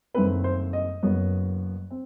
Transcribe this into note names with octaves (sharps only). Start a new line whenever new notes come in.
F#1 F#2 D#3 A3 C4 B4
C5
D#5
F#1 F#2 F#3 B3
C4